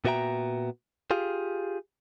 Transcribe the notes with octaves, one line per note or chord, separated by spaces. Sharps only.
A#2 B3 F#4 E5 G5 A#5
F4 G4 G#4 F5